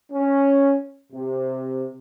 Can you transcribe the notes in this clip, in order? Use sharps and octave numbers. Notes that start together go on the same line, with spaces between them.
C#4
C3